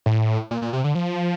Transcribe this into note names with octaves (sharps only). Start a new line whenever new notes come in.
A2
A#2
A#2
C3
D3
F3